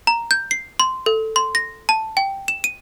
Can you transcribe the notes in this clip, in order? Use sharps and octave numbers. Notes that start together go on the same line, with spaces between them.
A#5
G6
C7
C6
A4
C6
A#6
A5
G5
E7
D#7